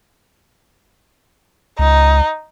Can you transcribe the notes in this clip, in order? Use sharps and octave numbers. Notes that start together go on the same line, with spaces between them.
C#2 D#4